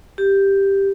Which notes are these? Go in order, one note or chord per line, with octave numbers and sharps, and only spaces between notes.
G4